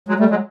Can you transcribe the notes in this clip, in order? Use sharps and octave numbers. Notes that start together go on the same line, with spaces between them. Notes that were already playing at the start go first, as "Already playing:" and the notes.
F#3 G#3
G3 A3
F#3 G#3